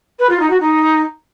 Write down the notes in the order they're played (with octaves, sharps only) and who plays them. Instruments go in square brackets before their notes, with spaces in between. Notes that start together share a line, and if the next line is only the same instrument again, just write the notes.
[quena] B4
F4
D#4
F#4
D#4